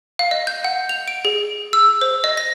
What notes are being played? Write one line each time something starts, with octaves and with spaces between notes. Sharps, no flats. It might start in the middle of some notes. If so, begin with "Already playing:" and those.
F5
D#5
G6
F#5
F7
D7
G#4
E6
C5
D#5
A#6